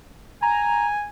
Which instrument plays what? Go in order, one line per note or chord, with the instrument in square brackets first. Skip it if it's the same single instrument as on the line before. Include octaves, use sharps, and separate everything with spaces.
[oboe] G#5 [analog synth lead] A#5